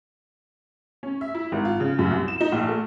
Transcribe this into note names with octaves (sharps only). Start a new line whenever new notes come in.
C#4
E5
E4
G#1
F4
C#3
F#2
C2
E7
D#4
A#1
A3